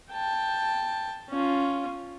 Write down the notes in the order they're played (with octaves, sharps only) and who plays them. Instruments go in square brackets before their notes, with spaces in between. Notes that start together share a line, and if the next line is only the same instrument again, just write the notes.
[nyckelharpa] G5 A5
C#4 F4